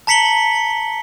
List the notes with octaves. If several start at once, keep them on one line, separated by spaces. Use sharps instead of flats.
A5 A#5 B6 C#7 F#7 G7